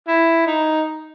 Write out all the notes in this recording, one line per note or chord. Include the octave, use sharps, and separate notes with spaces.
E4
D#4